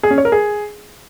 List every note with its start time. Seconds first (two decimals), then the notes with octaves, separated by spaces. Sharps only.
0.03 G#4
0.11 C#4
0.18 C#5
0.25 A#4
0.32 G#4